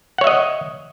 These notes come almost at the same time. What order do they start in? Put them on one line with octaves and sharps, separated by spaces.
F#5 C#5 E5 D#5